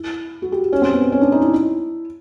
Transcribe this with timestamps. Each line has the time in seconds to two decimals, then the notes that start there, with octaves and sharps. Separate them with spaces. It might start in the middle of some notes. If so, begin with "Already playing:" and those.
Already playing: E4
0.42 F#4
0.52 G4
0.73 C#4
0.82 C4
0.92 B3
1.12 C#4
1.21 D4
1.32 D#4
1.41 E4